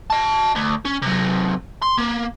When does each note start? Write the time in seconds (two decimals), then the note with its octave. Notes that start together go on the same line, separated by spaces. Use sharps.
0.10 D#5 A5
0.56 D2
0.85 C#4
1.02 C3 F#3
1.82 C6
1.98 A#3